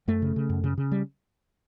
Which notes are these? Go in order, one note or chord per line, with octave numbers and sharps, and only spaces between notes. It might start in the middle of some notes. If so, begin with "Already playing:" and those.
F#2 A3
C#3
C#3
F#2
C#3
C#3
G3